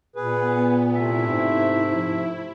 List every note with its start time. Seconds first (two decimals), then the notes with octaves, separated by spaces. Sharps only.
0.16 A#2 B3 G#4 B4
0.94 C3 A3 E4 E5
1.28 G#2
1.96 F3